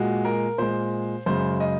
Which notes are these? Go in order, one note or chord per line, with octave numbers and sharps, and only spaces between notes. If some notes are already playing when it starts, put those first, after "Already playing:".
Already playing: A#2 G#3 F#4
A#4
A#2 G#3 C5
F#2 C#3 G#3 C5
D#5